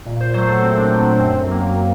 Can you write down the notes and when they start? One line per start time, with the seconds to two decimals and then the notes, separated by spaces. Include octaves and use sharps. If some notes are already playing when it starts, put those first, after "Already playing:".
0.06 A#2
0.20 C5
0.34 F#3 A3 C5
0.48 A4
0.63 A#2 C4
0.77 D4
0.91 F#3 A3 C4
1.05 D4
1.19 F#2 C4
1.47 F#3 A#3